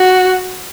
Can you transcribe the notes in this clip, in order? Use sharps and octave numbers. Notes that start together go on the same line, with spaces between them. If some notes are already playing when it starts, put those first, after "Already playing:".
Already playing: F#4